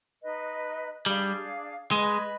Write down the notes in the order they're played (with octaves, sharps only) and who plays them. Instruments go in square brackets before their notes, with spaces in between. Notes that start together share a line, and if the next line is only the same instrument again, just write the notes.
[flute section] D#4 B4 D#5
[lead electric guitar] G3 [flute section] D4 G#4 D5 F5
[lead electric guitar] G#3 [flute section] B4 D#5 B5